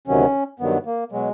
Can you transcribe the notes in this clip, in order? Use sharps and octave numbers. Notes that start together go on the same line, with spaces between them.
D2 C3 D#3 F#3 C#4
G2 D#3 F#3 B3
A#3
B2 F#3 G#3